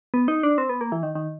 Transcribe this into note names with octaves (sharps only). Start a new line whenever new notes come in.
B3
D#4
D4
C4
B3
A#3
E3
D#3
D#3